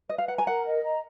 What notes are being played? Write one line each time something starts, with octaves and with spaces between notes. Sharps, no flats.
B4 D#5
F5
F#5 A#5
G#5
A#4 F#5
D#5
A#5